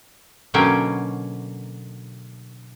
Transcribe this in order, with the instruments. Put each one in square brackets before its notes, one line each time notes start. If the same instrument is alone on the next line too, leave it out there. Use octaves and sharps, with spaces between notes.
[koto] B2 D3 F#3 A#3 C#4 G5